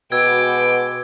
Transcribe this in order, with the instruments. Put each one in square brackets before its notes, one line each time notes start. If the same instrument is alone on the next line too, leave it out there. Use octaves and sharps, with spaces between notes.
[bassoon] B2 [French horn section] G#3 F#4 B4 [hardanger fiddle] G5 D6 [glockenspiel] E6 G#6